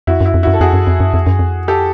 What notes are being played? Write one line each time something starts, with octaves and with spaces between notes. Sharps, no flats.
F2 E4 F#4
F#2 E4
F2
F#2 E4 F#4
A4
F2 F#4 G#4
F#2
F2
F#2
F2
F#2
F2
G4 A4